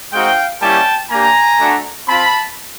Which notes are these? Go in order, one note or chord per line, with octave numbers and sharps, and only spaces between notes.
G#3 C4 D#4 F#4 F5 G5
G3 A#3 C#4 E4 G4 G5 A5
A#3 D4 G4 G#5 A#5
A3 D4 F#4
C4 F4 A5 B5